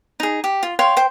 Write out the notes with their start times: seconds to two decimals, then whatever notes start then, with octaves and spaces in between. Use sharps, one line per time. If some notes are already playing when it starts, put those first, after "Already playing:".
0.20 D#4 G#4
0.44 G4
0.63 F4
0.79 C#5 F5 G5 C6
0.97 C5 G5